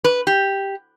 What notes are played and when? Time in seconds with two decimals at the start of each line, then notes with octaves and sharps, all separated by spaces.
0.04 B4
0.27 G4